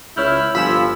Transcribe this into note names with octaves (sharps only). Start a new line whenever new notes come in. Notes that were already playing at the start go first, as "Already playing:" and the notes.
C#2 E4 C#5 F6 G6
G1 F3 F4 G#5 B5 E6